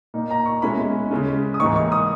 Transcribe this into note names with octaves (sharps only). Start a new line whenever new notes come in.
A#2 A#3 D#4
A#5
C#6
B2 G#3 C#4 E4 B5
C#3 G#3 C#4
D#6
G#2 E3 A#3 D#4 C#6
C#6
D#6